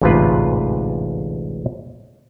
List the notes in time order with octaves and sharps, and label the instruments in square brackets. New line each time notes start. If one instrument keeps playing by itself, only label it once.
[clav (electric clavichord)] A1 D2 G#2 C3 F4 B4